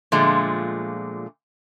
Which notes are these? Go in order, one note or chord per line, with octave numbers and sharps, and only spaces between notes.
A#2 D3 F3 G#3 A3